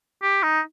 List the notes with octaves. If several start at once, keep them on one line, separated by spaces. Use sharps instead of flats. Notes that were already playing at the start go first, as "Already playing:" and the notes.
G4
D#4